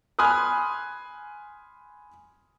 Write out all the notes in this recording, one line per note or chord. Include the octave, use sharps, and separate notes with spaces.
G#5 B5 C6 D#6 F6 F#6